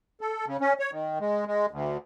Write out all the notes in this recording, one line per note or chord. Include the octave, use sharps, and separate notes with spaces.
A4
C#3
C#4
C#5
D#3
G#3
G#3
D2